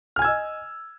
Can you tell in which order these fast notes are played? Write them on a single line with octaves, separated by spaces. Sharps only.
F6 G#5 G#6 E6 D#5